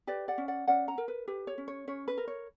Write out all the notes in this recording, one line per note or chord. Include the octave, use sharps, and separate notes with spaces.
G4 B4 D5
D5 F#5
C#4
D5 F#5
C#4 D5 F#5
F#5 A#5
A#4
B4
G4 B4
C#5
C#4
C#5
C#4 C#5
B4
A#4
C#5